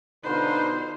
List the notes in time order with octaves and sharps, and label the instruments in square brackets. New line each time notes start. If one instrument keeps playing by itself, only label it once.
[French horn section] B2 D3 D#4 [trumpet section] D4 F4 B4 [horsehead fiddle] C5